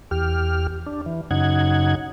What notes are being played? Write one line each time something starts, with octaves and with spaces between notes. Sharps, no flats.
E2 G4 F6
D4
E3
F#2 C#3 D#4 F#5 G#6